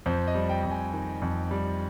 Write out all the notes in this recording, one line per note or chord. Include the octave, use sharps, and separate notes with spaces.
F2 C5
D#5
G3
G5
F2
G#5
D#3 G#5
F2
G3